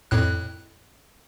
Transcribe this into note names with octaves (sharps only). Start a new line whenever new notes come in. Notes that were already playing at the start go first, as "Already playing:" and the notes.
F2 A2 F#6